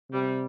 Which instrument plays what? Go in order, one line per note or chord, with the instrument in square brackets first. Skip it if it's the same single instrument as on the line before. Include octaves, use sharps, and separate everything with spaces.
[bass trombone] C3 [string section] G3